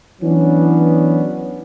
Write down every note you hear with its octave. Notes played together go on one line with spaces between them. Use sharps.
E3 F#3 B3 C#4 D4